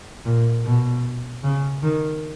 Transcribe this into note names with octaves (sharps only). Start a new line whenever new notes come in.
A#2
B2
C#3
D#3